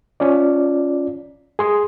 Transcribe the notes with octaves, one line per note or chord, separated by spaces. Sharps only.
C#4 F4 D5
G#4 C6 D#6